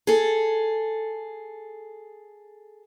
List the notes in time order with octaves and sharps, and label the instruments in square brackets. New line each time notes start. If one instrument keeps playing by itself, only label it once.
[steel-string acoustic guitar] G#4 A4